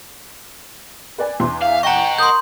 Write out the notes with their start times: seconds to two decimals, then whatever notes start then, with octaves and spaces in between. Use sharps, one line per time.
1.18 B4 D5 G#5
1.40 E2 E3 C6
1.61 E5 F5
1.83 D#5 F#5 G5 A#5 C#6
2.18 A#4 C6 D#6 G6